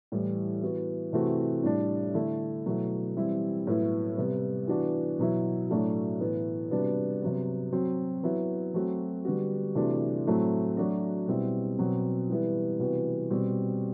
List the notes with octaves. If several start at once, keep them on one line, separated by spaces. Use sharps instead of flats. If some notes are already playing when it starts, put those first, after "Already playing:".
A2 E3 G3
E3 B3 F#4
C3 E3 A3 C4 F#4
A2 G3 D4
D3 A3 E4
B2 F#3 A3 E4
E3 G3 C4 E4
A2 F#3 B3 E4
C3 G3 B3
E3 B3 D4 F#4
B2 F#3 B3 E4
A2 F#3 A3 D4 F#4
A2 E3 B3 E4
C3 G3 B3 D4 F#4
C3 F#3 B3
F#3 C4 F#4
F#3 B3 E4
F#3 A3 C4 F#4
D3 G3 B3 F#4
C3 E3 A3 D4 F#4
A2 F#3 A3 C4
F#3 A3 D4 F#4
B2 G3 C4 E4
B2 F#3 C4
E3 G3 B3 E4
C3 E3 G3 B3 F#4
B2 G3 C4 F#4